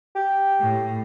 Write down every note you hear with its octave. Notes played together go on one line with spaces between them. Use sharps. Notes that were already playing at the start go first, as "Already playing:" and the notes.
G4
A2